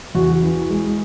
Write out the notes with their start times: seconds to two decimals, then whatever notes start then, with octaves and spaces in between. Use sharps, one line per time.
0.15 E2 F#4
0.42 E3
0.70 G#3